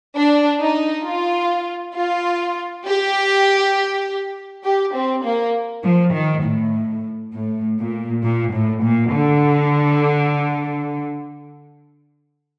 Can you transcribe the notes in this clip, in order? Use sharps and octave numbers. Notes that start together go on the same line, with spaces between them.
D4
D#4
F4
F4
G4
G4
C4
A#3
F3
D#3
A2
A2
A#2
A#2
A2
A#2
D3